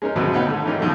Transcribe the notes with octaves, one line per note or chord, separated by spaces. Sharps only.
G#3 C#4 D#4 A#4
D2 B2 F#3 B3 C4
B3 D#4 F4 C#5 F#5 G5
G#2 D3 A3
E3 C#4 D#4 F4 G4 A#4
B1 B2 D#3 F3 A3